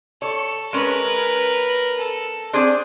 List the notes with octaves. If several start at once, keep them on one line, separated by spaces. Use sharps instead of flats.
A4 C#5
G#3 C#4 A#4 B4
A4
C4 D4 G#4